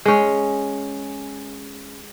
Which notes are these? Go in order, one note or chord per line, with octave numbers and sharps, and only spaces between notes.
G#3 C#4